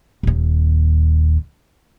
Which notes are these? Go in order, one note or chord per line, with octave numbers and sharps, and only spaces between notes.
D#1 D#2